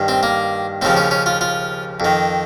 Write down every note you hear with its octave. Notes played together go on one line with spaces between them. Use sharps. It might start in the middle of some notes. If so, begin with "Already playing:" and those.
Already playing: G2 D#3
C4
A#3
D#2 C#3 F3 C4
C#4
C#4
F4
F4
F2 D#3